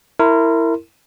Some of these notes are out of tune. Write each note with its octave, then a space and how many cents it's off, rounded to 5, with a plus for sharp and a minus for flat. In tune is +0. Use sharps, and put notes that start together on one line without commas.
E4 +0 A#4 -25 C6 +0